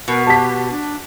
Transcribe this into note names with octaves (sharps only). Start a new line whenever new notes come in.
B2 A#4
G4 A5 B6
D4